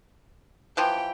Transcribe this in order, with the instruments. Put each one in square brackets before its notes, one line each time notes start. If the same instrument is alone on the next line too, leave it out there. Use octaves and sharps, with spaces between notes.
[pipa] E3 F3 G4 [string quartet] G5